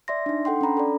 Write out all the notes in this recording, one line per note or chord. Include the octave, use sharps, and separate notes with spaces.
D5 E5 C6 A#6
D4 D#4
A4 F#5 G5 C6
C#4 D4 A#5 B5
A4 D5